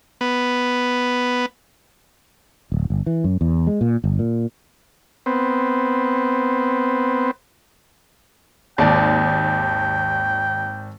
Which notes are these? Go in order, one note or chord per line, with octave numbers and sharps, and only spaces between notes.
B3
D1
G1
E3
F#2
E2
G#3
A#2
G1
A#2
B3 C4
G#1 D#2 D5 G5 A5